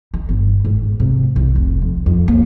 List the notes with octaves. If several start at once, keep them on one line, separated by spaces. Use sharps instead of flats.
D#3
G1
G#2
C3
C2
F1
F2
F2
A#3